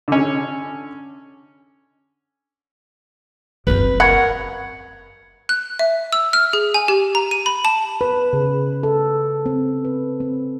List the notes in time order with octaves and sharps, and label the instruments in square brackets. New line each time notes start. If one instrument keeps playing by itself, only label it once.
[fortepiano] D3 C#4
[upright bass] F#1 C4 [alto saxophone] B4
[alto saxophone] A#4 [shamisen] F#5 B5 [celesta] C#6 G#6 C#7
[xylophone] F#6
E5
E6
F6
G#4
G#5
G4
A#5
D#7
B5
A5
[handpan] B4
C#3
A4
C4
B4
C4